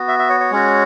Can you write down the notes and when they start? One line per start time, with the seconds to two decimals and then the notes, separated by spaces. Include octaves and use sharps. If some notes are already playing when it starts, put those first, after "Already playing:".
Already playing: B3 F#4
0.08 E5
0.19 E5
0.30 C#5
0.40 C#5
0.51 G#3 C#4 F#4